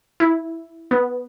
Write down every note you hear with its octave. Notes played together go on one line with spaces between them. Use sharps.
E4
B3